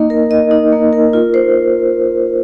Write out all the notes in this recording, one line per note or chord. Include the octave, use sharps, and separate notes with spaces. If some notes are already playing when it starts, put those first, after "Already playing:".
Already playing: A#3 D#4 D#5
A#4
D#5
D#4
A#3
A#4
F4
C5